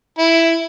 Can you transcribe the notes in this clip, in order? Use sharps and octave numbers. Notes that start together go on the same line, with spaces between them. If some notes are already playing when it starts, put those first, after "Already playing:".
E4